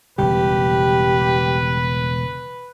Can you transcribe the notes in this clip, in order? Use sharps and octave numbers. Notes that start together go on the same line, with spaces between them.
E1 C#3 G3 G4 B4